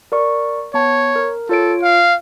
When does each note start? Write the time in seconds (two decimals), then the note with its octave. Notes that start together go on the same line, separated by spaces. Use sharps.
0.12 A#4 D5 C#6
0.74 B3 C#5 A5
1.16 A#4
1.49 F4 A4 C#5 D7
1.82 F5